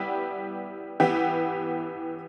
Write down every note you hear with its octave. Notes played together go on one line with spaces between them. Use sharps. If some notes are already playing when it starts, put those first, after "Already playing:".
Already playing: G3 B3 E4 G4
E3 B3 E4 G4